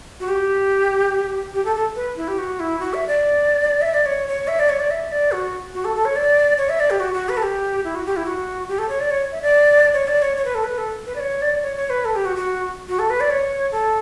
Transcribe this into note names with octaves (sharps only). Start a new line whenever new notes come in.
F#4
G4
G4
A4
A4
B4
E4
G4
F#4
E4
F#4
E5
D5
E5
D5
C#5
C#5
E5
D5
C#5
D5
E5
D5
F#4
F#4
A4
A4
C#5
D5
C#5
E5
D5
G4
F#4
F#4
B4
A4
G4
E4
F#4
G4
E4
F#4
G4
A4
C#5
D5
C#5
E5
D5
C#5
D5
C#5
C#5
B4
A4
B4
A4
B4
D5
C#5
D5
C#5
C#5
B4
A4
G4
F#4
F#4
F#4
A4
B4
D5
C#5
A4